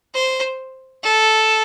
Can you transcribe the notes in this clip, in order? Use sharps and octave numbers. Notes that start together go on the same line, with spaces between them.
C5
A4